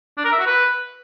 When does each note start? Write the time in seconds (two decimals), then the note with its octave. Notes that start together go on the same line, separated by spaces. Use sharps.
0.18 D4
0.25 A#4
0.32 E5
0.39 F#4
0.46 B4